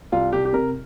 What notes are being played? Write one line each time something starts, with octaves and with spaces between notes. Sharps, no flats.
C2 F4
C2 G4
G4
C3 A#4